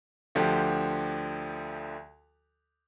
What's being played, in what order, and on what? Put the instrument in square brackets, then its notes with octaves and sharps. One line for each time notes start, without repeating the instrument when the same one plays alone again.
[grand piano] D2 D3 F3 G4